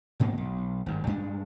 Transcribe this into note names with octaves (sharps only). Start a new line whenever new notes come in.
F#1 G#2 B2 A#3
B1
G#1 G2
G2 G#3 D4